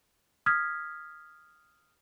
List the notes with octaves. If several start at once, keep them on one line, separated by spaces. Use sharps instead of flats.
D#6 F6 G#6 B6